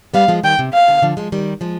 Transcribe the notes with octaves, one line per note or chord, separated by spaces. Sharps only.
G3 B3 F5
F3 G#3
D#3 G3 G5
C3
C3 F5
B2 D3
D3 F3
F3 G#3
D#3 G3
F3 G#3